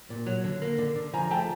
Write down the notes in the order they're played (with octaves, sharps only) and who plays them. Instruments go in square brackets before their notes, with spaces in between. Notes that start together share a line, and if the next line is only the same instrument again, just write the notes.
[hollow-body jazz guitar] A#2
F#3
D3
A#3
D3
D3
[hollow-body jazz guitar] F3 [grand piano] G#5 A#5
[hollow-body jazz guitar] A3 [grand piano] G5 A5